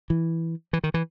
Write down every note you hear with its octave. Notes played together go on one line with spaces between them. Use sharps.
E3
E3
D#3
E3